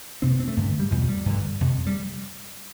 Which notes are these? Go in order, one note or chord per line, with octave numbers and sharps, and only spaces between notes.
F2 C3 C4
B3
C4
A3
G2 D3
G3
E2 B2 F3
G3
G2 D3
F2 C3
G3